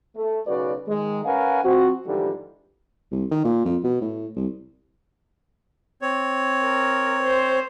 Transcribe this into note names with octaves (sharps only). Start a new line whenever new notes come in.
A3
B1 C#3 F#4 B4 D5
D#3 G#3
C#4 A#4 B4 F5 F#5 G#5
F3 C4 F#4
G#2 D3 E3 F3 G3
C2
D#3
A#2
F2
B2
A2
C2
C4 C#5
A#4
C5